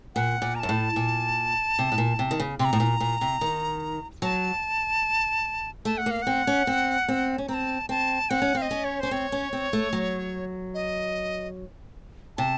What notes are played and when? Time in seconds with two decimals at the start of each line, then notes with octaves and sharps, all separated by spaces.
0.15 A#2 F#5
0.42 A#2
0.55 A#5
0.60 F#2 A5
0.69 A2
0.96 A#2
1.79 C3
1.92 A2
1.98 A#2
2.19 C3
2.31 D#3
2.40 C#3
2.59 C3 C6
2.65 A#5
2.73 A2
2.80 A#2
3.00 A#2
3.21 C3
3.41 D#3
4.22 F#3 A5
5.85 A3 A5
5.98 F#5
6.06 A#3 F5
6.22 C4 F#5
6.47 C#4
6.67 C4
7.08 C4
7.38 C#4
7.48 C4 A#5
7.54 A5
7.89 C4 A5
8.30 C4 F#5
8.42 C#4
8.55 C4 F5
8.62 D#5
8.71 C#4
8.84 C#5
9.00 C#4 C5
9.11 C4 C#5
9.32 C#4
9.53 C4
9.73 A3
9.93 F#3
10.74 D#5
12.37 C3 A5